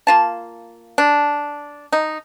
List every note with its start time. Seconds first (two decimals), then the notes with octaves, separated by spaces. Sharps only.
0.07 A#3 F4 A5
0.98 D4
1.92 D#4